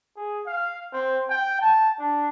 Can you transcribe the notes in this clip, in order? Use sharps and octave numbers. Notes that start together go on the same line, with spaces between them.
G#4
F5
C4
G5
A5
D4